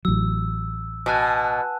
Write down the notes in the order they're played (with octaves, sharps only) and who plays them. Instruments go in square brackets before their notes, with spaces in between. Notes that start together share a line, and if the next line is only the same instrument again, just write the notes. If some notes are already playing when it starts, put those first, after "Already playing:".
[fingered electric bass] A1 F#3 [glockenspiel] E6
[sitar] B2 [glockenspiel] G#5 A5 F#6